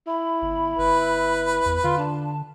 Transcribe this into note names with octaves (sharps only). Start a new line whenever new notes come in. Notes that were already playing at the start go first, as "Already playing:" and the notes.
E4 B5
G1
G1 B4
E2
D3 F4 C6
D4 A5